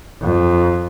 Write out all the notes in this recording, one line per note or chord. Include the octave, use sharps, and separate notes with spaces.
F2